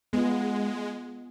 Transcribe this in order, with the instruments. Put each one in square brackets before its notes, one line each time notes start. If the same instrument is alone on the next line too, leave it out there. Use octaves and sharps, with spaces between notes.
[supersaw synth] G#3 [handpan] B3 F4